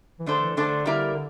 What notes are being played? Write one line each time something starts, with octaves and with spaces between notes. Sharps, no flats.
E3
D3 A3 D4 A4 C5
E3
D3 A3 D4 A4 C5
G3 A#3 E4 A#4